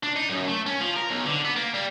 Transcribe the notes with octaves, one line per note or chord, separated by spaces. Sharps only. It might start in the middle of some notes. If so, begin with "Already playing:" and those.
D4
D#4
F#2
A3
C#4
F3
A#4
B1
D3
B3
A#3
G3